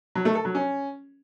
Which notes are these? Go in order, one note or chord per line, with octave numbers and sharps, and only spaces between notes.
F#3
A3
A4
F#3
C#4